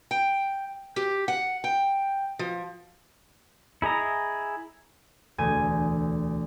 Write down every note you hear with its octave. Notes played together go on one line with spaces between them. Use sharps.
G5
G4
F#5
G5
F3
E4 G#4 D#5 A#5
E1 D2 A3 G#5